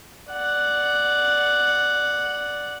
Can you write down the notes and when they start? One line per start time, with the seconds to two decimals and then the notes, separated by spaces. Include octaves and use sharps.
0.31 D5 F#5